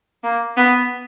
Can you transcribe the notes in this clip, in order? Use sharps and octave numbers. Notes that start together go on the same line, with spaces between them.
A#3
B3